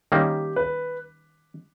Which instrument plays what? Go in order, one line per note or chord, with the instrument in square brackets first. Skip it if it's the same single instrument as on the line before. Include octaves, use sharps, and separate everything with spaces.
[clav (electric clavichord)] D#3 G3 A#3 C#4 [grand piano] G4
[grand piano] B4